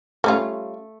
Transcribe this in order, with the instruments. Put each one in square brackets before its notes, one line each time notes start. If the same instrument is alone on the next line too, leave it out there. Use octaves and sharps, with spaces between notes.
[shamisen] G3 C#4 F4 [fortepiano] A3